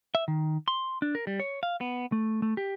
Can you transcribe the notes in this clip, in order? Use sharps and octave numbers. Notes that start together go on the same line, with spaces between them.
E5
D#3
C6
D4
A#4
G3
C#5
F5
B3
A3
A3
G4